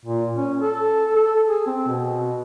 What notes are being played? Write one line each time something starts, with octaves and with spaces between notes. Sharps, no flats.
A#2
C#4
A4
A4
G#4
C4
B2